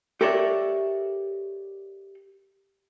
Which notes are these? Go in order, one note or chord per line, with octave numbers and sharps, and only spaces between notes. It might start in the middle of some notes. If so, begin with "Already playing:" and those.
G4 A4 A#4 C#5 D5 E5